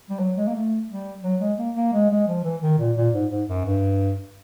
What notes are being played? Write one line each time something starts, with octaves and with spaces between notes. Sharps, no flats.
G3
F#3
G#3
A#3
A3
G3
F#3
G#3
A#3
A#3
G#3
G#3
F3
E3
D#3
A#2
A#2
G#2
G#2
F#2
G2